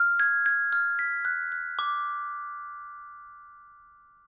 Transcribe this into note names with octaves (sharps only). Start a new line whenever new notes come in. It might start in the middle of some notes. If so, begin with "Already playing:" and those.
Already playing: F6
G#6
G#6
F6
B6
F#6
F#6
D6